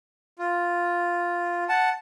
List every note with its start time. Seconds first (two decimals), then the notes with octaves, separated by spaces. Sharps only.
0.39 F4
1.69 F#5 A5